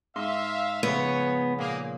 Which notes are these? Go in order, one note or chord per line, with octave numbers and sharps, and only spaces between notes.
G#2 D#4 E5 F5 C6
C#3 F3 B3 C#5
A#2 A#3 G#4